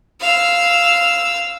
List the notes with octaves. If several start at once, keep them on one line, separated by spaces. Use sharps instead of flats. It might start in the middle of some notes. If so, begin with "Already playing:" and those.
F5 E6